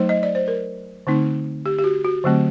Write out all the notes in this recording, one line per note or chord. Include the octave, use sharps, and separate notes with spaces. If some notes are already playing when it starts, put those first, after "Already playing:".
Already playing: F#3 A3 D#4 C5
D#5
D5
C5
A#4
D3 A3 C4 D#4
G4
G4
F#4
F#4
D3 F#3 A3 C4